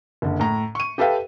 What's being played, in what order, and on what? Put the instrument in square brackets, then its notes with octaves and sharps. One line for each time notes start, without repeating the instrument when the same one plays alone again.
[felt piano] F#1 D3
A2 A#5
C#6 D#7
G4 A4 B4 E5 F5 G5